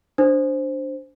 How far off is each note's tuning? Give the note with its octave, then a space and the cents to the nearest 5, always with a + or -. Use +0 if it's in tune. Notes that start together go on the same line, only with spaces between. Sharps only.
D4 +0 C5 +0